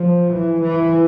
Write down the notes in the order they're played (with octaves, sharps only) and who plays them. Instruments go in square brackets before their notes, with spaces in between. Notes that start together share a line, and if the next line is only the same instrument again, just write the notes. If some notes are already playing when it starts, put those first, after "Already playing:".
Already playing: [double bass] F3
E3
E3